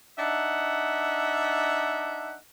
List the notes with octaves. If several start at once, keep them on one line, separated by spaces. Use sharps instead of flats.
D4 D#4 E5 F#5